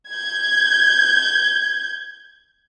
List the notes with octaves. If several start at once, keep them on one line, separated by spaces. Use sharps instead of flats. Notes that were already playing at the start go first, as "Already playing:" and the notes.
G6 G#6